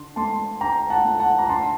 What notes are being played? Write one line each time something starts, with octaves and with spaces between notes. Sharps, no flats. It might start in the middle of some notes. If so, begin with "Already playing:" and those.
Already playing: D3 C6
A3 A5 C6
D3 G5 A#5
F#5 A5
A3
F#5 A5
A#5
D3 A5 C6